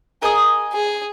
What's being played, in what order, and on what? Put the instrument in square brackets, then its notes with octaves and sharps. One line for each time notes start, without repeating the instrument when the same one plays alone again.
[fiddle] G#4 [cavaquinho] A#4 D#5 G#5 D#6
[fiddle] G#4